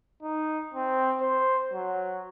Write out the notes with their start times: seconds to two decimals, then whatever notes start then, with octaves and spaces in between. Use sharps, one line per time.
0.23 D#4
0.74 C4
1.21 C5
1.73 F#3